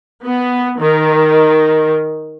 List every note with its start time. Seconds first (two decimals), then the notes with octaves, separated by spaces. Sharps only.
0.24 B3
0.78 D#3